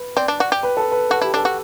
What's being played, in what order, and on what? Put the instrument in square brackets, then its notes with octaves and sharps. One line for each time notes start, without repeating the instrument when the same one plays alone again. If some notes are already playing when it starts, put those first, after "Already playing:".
Already playing: [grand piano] B4
[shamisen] C4 [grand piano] D5
[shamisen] D4
F#4
G4
[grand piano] B4
A4
B4
[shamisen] F#4 [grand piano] A4
[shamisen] E4 [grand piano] G4
[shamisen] D4 [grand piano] A4
[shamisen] F#4